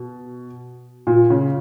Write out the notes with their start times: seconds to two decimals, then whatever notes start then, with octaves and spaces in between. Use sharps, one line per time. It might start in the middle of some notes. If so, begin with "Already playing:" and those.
Already playing: B2
1.07 A#2
1.30 C#3